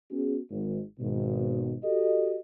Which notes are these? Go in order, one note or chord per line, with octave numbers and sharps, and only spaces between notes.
B3 C#4 F#4 G#4
G#1
G#1 B2
F#4 G4 A4 D#5